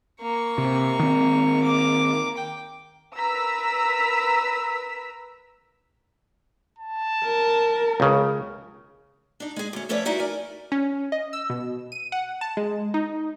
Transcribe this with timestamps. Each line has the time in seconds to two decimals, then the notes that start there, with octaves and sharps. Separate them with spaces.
0.21 A#3 C#6
0.58 C3
1.00 D#3 C4
1.64 A#3 D6
2.37 G5
3.16 A#4 B4 A#5 E6 B6
6.78 A5
7.23 A#4
8.00 C#2 C#3
9.40 D4 D#4
9.56 G#3 G#4
9.73 D2 C#4
9.89 F3 A3 C#4 B4 C#5 D5
10.05 G3 D#4 E4 F#4
10.20 A#4 D5 G#5
10.72 C#4
11.12 D#5
11.33 E6
11.50 B2
11.92 D#7
12.12 F#5
12.41 A5
12.57 G#3
12.94 D#4